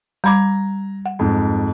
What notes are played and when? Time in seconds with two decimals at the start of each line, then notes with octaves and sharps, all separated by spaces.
0.24 G3 A#5 B5 D6 G#6
1.06 F#5
1.19 F2 G#2